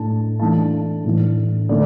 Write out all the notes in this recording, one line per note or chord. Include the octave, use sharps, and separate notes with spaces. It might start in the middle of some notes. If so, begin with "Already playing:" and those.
Already playing: A2 A3 D4 A5
E3 A3 D4 A5
A2 E3 A3 D4
D3 A3 D5